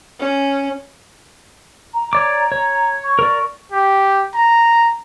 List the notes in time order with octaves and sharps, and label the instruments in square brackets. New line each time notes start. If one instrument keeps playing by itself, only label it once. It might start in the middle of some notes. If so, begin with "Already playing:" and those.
[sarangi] C#4
[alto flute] A#5
[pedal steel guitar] C#5 D5 D6
C#5
[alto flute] C#6
[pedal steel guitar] A#4 D5
[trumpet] G4
A#5